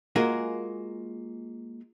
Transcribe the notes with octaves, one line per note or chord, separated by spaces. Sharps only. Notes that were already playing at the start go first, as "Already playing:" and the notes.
G#3 A#3 F4 F#4 G#4 A#4